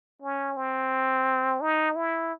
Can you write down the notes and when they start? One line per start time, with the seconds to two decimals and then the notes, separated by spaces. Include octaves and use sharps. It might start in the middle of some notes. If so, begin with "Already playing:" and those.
0.22 C#4
0.57 C4
1.61 D#4
1.96 E4